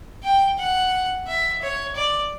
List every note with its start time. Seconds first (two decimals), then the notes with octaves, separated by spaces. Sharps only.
0.23 G5
0.58 F#5
1.27 E5
1.62 C#5
1.96 D5